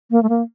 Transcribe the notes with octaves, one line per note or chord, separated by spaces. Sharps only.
A#3
A3
A#3